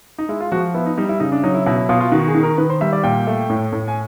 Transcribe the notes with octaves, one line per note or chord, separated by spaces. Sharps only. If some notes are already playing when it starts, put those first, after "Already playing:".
D#4
G#3 E4
F4
F3 F#4
B3 E4
D#4
G3 D#4
E4
C#3 D#4
D4
F#3 D#4
E4
B2 E4
E4
B2 F4
F4
D#3 F#4
G#4
D#3
A#4
D#3 B4
C5
G3 E5
D5
A#2 G5
A3
A2
A2
G#5